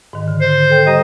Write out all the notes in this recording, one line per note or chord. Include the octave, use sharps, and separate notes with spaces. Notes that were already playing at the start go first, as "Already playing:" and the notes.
G#2 D#3
D3
C5
A4 G5 G6
G3 G4 D#5 A#5